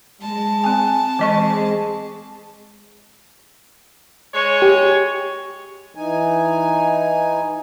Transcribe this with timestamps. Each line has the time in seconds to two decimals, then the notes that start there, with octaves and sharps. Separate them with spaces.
0.22 G#3 A5
0.64 C4 G#5
1.19 E3 G#3 C4 G#4 D#5 C#6
4.34 G#3 C#5
4.62 G4
5.95 E3 D#4 G#5